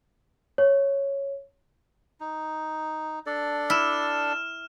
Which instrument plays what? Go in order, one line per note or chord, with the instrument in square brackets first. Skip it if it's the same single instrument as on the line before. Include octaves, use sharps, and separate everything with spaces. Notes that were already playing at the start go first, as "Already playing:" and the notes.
[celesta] C#5
[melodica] D#4
D4 A4 D5
[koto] E4 [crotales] F6 E7